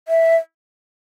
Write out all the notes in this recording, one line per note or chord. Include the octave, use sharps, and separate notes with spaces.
E5